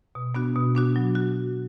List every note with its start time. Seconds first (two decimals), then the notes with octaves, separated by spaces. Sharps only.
0.15 B2
0.35 B3 D4 F#4
0.56 B2
0.75 B3 D4 F#4
0.96 F#3
1.15 F#4